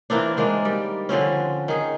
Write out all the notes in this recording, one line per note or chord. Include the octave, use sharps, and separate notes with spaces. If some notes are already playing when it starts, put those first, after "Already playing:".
E3 A#3 C4 D4
D#3 G#3 A#3 D4
G3
D3 F3 C4 C#4
D#3 G#4